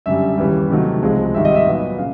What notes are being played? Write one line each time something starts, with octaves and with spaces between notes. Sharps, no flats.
F#2 D3 G3 E5
D#2 C#3 E3 G3
C3 D#3 F#3 A3
C#2 C3 F3 G#3
G#2 D#3 G3 C4 E5
D#5
E5
A#2 F#3 B3
C#3 F5